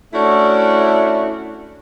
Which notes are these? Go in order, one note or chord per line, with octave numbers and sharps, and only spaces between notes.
A3 C#4 D4 E4 F#4